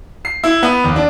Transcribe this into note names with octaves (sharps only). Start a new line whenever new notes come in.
C7
E4
B3
D#2
D4